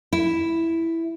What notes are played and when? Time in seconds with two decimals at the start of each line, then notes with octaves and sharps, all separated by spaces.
0.13 E4